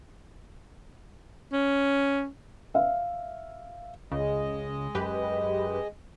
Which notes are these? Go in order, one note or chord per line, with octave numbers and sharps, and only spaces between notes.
C#4
E5 F5
C#2 C#3 G#3 D#5
F#2 G4 B4